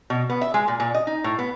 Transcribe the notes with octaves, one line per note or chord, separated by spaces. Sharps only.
B2
B3
E5
G#3
A#2
A#2
D#5
D#4
A2
B3